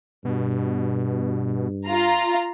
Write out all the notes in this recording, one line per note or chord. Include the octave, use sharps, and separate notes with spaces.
G2 B2
F4 A#5